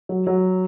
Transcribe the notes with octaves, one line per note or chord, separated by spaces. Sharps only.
F#3
F#3